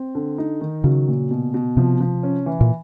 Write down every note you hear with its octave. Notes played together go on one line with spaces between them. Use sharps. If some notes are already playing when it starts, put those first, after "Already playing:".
Already playing: C4
D3
D#4
D#3
C#3 F#3
A#2
B2
B2
C3 F3
F3
C#4
E3
A#2